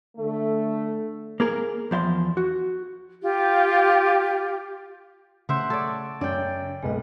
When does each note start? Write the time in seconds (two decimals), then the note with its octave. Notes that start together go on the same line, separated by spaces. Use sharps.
0.17 D3 A3
1.40 A#3 G#4 A#4
1.91 E2 F3 E5 C6
2.37 F#4
3.21 F4 G4
5.49 C#3 A3 C5 E5 F#5
5.70 A4 C#5 D5
6.21 F#2 C#5 D5 G5
6.83 F#1 B1 G#3 B4 D#5